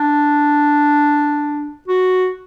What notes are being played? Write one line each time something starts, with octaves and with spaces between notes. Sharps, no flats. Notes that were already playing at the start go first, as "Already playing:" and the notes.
Already playing: D4
F#4